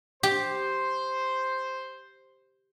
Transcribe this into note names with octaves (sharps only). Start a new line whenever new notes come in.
G4 C5